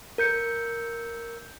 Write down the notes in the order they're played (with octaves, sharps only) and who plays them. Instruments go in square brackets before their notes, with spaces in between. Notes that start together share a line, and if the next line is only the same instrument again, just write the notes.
[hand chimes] A#4 G6 C#7